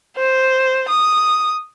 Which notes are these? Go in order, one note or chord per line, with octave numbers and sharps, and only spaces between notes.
C5
D#6